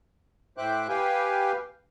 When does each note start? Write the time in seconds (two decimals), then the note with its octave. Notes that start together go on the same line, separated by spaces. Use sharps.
0.58 A2 C5 E5 G5 D6 F#6
0.89 G4 B4 F5 G5 G#5